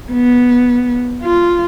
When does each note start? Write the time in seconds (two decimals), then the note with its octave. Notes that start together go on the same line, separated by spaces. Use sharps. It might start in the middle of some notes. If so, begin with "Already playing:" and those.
0.12 B3
1.23 F4